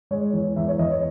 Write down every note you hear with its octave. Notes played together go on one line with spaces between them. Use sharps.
G#3 C#5
E2
E2 E5
C#5
E2 D#5
C#5